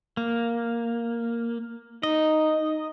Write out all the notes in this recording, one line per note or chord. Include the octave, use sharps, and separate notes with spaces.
A#3
D#4 D#5